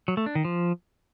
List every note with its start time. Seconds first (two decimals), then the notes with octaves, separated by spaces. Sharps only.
0.08 F#3
0.17 A3
0.26 D4
0.35 D#3
0.45 F3